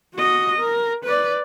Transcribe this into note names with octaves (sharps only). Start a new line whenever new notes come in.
F#4 D#5
A#4
B4 D5